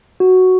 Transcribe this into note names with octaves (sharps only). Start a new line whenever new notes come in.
F#4